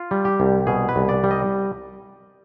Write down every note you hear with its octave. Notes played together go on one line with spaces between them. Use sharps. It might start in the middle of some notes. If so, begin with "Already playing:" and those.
Already playing: F4
G3
G4
C2
B2 G#4
B4
C2
D5
G3
D#5